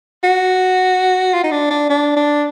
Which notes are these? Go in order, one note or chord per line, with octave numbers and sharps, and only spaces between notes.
F#4
F4
D#4
D4
D4
D4
D4